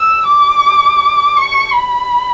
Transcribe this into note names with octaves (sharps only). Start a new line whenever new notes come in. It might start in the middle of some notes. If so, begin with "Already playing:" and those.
Already playing: E6
D6
C#6
B5